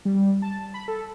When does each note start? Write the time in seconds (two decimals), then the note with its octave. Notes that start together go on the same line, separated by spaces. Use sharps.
0.05 G3
0.42 A5
0.74 B5
0.88 A4